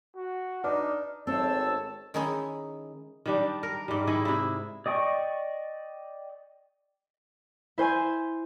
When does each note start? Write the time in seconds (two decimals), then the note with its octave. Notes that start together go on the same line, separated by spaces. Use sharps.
0.16 F#4
0.64 D4 D#4 B4 D5 D6 F6
1.27 G#1 C4 A4 C#5 A5 E6
2.14 D#3 G#3 C#4 D#4 E4 G#4
3.26 D#3 G3 D4
3.63 A#4
3.88 G#2 G3
4.07 D#3 E4 G#4
4.25 C3 E4
4.86 D5 D#5 G5 C#6
7.78 E4 C5 G#5 C6